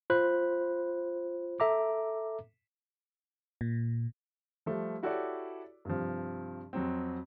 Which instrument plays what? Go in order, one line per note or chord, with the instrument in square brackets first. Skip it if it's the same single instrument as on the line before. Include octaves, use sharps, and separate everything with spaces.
[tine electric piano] F4 C5 B5 F#6
A4 E5 A#5 D6
[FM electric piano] A#2
[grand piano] F3 G3 A3
E4 F#4 G4 A4 C#5 D5
G2 C3 F3
F2 F#3 C4